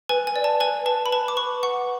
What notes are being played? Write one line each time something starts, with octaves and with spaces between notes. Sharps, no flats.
B4 G#5
G#5
D5
A5
B4 G#5
B4 A5
B5
B4 A5
D6
B4 C#6
F#5 C#6